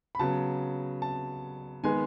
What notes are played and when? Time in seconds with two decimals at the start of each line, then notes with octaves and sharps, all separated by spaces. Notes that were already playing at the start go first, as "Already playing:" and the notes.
0.15 B5
0.19 C#3 F#3 B3 A5
1.02 A5
1.83 D#3 G#3 B3 G#5